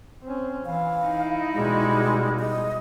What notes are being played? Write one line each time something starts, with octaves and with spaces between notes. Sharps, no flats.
C4 C#4
E3 F5
D#4 E4
B2 G3 G#3
D#5